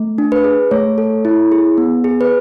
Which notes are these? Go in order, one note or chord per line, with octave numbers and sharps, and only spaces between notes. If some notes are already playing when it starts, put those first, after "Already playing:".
Already playing: A3
D4
B4
G#4
A3 C#5
A4
E4
G#4
B3
G#4
B4